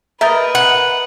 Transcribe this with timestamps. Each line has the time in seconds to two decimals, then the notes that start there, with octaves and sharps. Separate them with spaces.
0.21 A#4 B4 D#5 E5 G6 A6
0.55 F#5